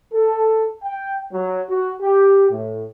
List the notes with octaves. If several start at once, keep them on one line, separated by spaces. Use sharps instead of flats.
A4
G5
F#3
F#4
G4
A2